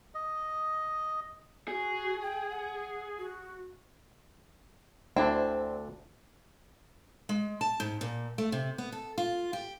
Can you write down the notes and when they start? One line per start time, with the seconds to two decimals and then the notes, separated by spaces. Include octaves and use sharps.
0.15 D#5
1.68 F#4 G#4
2.22 G5
2.50 F#5
3.19 F#4
5.16 D2 C4 D4 E4
7.29 G#3
7.61 A5
7.80 G#2
8.01 A#2
8.38 A3
8.52 C3
8.78 B3
8.92 A4
9.18 F4
9.53 G4